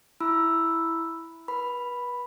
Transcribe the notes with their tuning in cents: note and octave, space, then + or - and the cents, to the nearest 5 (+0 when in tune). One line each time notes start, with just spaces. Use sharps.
E4 +0 B5 +0 E6 +0
B4 -30 B5 +0